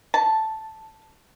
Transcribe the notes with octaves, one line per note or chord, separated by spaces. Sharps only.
A5